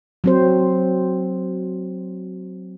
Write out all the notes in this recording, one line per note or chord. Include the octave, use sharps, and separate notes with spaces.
F#3 C4 C5